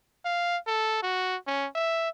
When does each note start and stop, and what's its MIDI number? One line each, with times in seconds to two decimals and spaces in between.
0.25 0.57 77
0.67 1.00 69
1.02 1.37 66
1.47 1.67 61
1.75 2.09 76